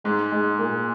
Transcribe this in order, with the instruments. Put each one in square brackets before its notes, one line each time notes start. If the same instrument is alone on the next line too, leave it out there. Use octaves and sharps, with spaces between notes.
[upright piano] G#2 [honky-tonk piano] G#3
[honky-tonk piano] G#3
A#2